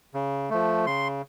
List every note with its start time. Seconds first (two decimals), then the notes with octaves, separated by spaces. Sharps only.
0.14 C#3
0.50 F3 A3
0.86 C#3 C6